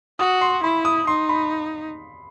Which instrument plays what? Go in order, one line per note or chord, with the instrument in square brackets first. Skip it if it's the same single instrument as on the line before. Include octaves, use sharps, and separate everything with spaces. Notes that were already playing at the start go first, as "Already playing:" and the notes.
[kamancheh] F#4 [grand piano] D#6
[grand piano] C6
[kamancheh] E4 [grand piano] B5
[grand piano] D#6
[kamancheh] D#4 [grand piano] C6
[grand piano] B5